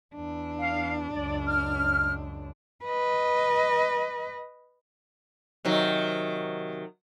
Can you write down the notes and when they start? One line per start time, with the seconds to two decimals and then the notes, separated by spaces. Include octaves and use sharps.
0.15 E2 D4
0.60 F5
1.13 C#2 F#2 D5
1.47 F6
2.85 B4 D#5
5.65 C3 D#3 F#3